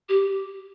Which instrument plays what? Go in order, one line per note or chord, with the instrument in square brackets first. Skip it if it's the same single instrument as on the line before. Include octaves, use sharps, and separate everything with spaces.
[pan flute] G4